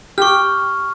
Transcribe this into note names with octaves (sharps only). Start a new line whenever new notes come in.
G4 C#6 F6